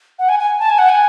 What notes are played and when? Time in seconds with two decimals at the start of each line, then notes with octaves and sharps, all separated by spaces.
0.19 F#5
0.29 G#5
0.39 G#5
0.59 A5
0.69 G#5
0.79 F#5
0.89 G#5